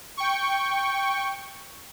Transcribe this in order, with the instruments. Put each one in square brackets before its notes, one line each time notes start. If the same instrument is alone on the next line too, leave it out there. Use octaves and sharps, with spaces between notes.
[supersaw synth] G5 C#6